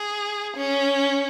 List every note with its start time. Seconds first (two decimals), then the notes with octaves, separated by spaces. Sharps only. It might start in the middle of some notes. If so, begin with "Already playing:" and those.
Already playing: G#4
0.56 C#4